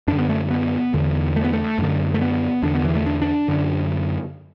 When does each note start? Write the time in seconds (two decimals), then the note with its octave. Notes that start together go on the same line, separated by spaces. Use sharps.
0.08 F#2 D3 D4
0.19 B3
0.29 A3
0.50 B3
0.94 E2 D3
1.36 A3
1.44 B3
1.53 A3
1.78 F#2 D3
2.14 A3
2.22 B3
2.63 E2 D3 D4
2.75 B3
2.85 E3
2.96 A3
3.06 D4
3.22 D4
3.48 F#2 D3